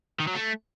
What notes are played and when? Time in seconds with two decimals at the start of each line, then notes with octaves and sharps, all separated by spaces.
0.20 D#3
0.28 F#3
0.35 A3